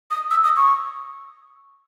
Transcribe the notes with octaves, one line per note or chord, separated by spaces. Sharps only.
D#6
E6
D#6
C#6